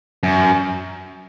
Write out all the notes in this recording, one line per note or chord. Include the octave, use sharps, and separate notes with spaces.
F#2